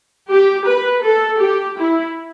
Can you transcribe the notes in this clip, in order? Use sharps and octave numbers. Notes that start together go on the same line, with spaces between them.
G4
B4
A4
G4
E4